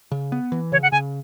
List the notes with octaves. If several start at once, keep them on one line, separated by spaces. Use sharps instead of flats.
C#3
B3
E3
C#3 C#5
F#5
C#3 G#5